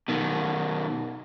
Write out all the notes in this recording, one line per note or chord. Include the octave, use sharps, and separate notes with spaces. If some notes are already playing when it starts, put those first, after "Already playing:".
B2 D#3